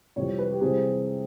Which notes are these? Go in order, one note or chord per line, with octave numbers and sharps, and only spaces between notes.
F2 C3 E3 G3 C#5
B4
G4
C3 E3 G3 C4 G#4